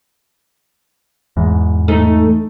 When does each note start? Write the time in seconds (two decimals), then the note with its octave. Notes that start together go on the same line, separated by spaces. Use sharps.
1.37 E2 G#2
1.88 A3 D#4